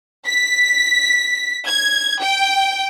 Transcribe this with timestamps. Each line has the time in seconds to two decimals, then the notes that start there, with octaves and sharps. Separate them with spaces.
0.25 B6
1.66 G#6
2.20 G5